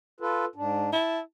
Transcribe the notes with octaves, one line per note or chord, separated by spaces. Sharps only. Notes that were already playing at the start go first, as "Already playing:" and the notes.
F4 A4 B4
G#2 D4
E4 A5